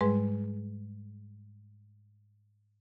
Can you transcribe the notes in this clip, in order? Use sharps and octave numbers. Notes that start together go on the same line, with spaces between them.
G#2 G3 G#3 G#4 B4 C6